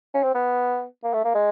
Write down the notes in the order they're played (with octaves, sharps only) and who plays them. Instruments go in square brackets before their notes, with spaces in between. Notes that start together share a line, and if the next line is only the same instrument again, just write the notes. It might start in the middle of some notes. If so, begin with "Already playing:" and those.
[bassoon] C#4
C4
B3
A#3
A3
A#3
G#3